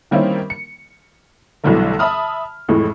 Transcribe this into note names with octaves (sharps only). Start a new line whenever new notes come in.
D#3 G3 A#3 C4 C#4 E4
C#7
B1 D3 E3 F#3 G3 A3
E5 A5 B5 D#6 F6
F2 A2 E3 G#3